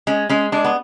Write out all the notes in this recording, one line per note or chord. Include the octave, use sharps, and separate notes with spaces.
G#3 C#4
G#3 C#4
G#3 D4
B3